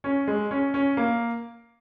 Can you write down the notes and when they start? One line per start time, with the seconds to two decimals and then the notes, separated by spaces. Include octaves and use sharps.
0.04 C#4
0.27 G#3
0.51 C#4
0.74 C#4
0.97 A#3